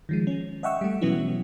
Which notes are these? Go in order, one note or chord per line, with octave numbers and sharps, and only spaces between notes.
D#3 F3 G#3
C#4
D#5 E5 F#5 G5 C#6 E6
G3 A3
B2 E3 F#3 B3 C#4 E4